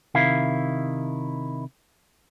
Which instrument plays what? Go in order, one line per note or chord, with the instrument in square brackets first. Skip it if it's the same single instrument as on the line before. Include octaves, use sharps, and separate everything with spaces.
[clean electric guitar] C3 D#3 E4 F5